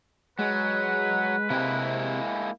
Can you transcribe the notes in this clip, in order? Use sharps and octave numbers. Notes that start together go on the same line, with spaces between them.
F#3 G#3 B4
C3 G#3 A#3 E4